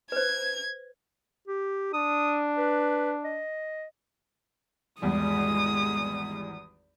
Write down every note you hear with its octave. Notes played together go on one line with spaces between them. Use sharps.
B4 C5 G#6
G4
D4 D#6
B4
D#5
G#1 E2 G3 G#3 D#6